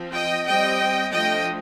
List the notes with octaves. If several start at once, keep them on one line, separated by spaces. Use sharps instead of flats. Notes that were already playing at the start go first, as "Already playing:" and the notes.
Already playing: F3 C4
D#5 G5
G3 C4 D#5 G5
F3 A3 D4 D#5 G5